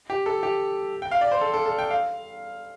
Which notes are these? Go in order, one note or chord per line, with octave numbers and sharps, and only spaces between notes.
G4
A4
G4
G5
F5
D5
C5
A4
A4
A4
G5
F5